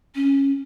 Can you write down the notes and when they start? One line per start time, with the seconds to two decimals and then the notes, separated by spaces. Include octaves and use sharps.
0.15 C#4